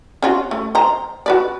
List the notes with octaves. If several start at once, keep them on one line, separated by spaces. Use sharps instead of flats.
C#4 F4 F#4
A3
C5 A#5
F#4 B4 D5